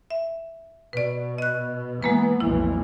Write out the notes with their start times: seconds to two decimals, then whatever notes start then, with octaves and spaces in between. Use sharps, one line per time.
0.11 E5
0.93 B2 B4 D5
1.38 D#5 F#6
2.03 E3 G#3 A#3 B3 B4
2.40 B1 F2 E3 E4